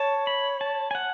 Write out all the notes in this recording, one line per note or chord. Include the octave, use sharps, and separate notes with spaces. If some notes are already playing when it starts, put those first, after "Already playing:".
Already playing: C#5 A5
B5
A5
G#5
F#5